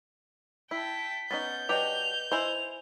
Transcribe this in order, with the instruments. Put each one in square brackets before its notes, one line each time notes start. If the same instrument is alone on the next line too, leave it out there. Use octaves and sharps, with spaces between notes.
[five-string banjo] E4 [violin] G5 A5 [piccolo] B6
[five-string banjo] B3 C#4 D#4 [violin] G6 [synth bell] A6
[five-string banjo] F#3 D4 G4 [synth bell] B4 D#5 [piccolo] F7
[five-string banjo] E4 C5 [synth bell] D#5 G#5 [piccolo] F7